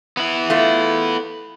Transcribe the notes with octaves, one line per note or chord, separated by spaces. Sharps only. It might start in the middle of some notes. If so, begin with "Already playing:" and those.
B3 E4
A3 F4